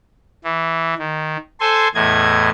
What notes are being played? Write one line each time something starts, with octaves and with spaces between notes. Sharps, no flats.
E3
D#3
A4 C5 G#5 C6
E2 A2 D#5 G#6